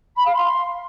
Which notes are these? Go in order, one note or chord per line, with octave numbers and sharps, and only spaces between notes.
B5
F5
C6